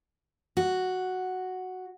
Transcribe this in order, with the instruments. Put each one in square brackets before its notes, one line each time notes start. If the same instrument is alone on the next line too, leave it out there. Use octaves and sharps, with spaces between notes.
[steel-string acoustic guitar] F#4